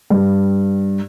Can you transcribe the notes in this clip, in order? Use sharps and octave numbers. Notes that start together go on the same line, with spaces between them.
G2